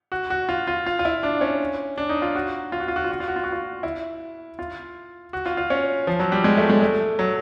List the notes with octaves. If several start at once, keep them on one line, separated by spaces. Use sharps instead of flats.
F#4
F#4
F4
F4
F4
F4
E4
D4
C#4
D4
D#4
F4
F#4
F4
F#4
F4
F#4
F4
F#4
F4
F#4
F4
F#4
F4
E4
F4
F#4
F4
F4
C#4
F3
F#3
G3
G#3
A3
G#3
A3
F#3